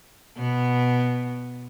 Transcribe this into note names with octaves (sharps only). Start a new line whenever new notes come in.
B2 B3